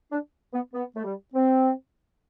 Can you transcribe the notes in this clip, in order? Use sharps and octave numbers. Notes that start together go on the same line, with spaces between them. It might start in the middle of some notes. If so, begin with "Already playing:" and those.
D4
B3
B3
A3
G3
C4